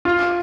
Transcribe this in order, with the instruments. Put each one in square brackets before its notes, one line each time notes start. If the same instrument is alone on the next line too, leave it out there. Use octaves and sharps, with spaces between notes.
[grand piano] F4